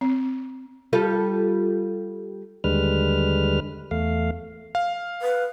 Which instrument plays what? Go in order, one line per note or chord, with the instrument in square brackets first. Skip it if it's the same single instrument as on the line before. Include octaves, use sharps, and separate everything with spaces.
[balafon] C4
[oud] G3 F4 A4
[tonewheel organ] D#2 D3 G3 G#3 B4 F6
E2 A3 F5
[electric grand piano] F5
[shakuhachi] B4